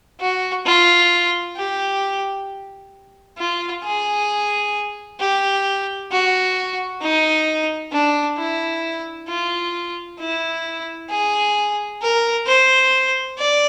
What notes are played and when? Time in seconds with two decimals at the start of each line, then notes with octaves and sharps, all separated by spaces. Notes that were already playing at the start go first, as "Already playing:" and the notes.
0.20 F#4
0.66 F4
1.57 G4
3.38 F4
3.83 G#4
5.20 G4
6.11 F#4
7.01 D#4
7.92 D4
8.37 E4
9.28 F4
10.19 E4
11.10 G#4
12.02 A#4
12.46 C5
13.38 D5